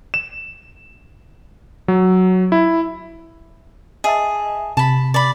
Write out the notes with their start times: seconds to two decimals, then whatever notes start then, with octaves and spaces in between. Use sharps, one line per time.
0.14 E7
1.88 F#3
2.52 E4
4.04 G#4 D#5 E5 A5
4.77 C3 A5 B5
5.14 D5 B5